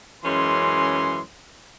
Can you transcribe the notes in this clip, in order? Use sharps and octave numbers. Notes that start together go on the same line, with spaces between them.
F#2 E3 G#3 C#4 C6